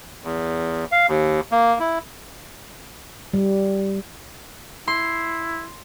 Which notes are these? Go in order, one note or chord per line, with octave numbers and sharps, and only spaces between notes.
E2
F5
D#2
A#3
E4
G3
E4 C6